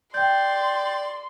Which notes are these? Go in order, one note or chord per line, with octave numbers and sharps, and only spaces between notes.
D5 G5 C6 G6